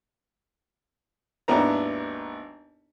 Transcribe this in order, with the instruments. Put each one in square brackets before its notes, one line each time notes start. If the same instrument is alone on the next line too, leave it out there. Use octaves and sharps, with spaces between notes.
[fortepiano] G#1 D#2 B3 D4 E4 A#5